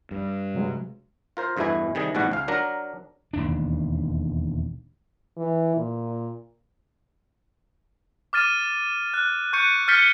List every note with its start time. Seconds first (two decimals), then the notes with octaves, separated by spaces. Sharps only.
0.11 G2
0.54 C3 F#3 G#3
1.37 F4 A#4 C5
1.57 E2 G2 B2 A3 E4 G#5
1.95 C3 D#3 G3 G#4
2.15 A1 G#2 B2 G3 F#4 F#5
2.32 C#2 F5
2.48 F#3 D4 A#4 A#5
3.33 E1 D#2 D4
5.37 E3
5.77 A#2
8.33 D6 F6 A6 D#7
9.14 F#6
9.53 C#6 F#6 G6 C#7 D#7
9.88 F6 G6 A6 B6 C#7 G7